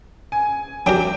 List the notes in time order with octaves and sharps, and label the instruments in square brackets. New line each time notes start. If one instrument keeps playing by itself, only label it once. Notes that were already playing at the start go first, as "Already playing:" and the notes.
[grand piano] G#5
[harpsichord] F#3 A3 D4 G4 A#4 [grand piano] G5